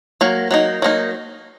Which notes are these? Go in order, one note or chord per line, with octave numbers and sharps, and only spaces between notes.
F#3 A#3
F#3 A#3 D#4
F#3 A#3 D#4